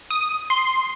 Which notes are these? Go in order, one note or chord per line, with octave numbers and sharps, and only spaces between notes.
D#6
C6